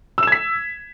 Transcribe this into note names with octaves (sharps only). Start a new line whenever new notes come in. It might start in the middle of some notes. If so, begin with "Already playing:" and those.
E6 G#6 B6 E7